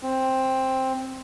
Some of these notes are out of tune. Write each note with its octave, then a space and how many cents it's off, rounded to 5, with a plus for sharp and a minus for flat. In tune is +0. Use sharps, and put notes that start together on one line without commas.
C4 +5